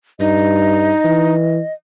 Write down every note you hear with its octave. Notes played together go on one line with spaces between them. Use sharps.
G2 D#4 D#5
E3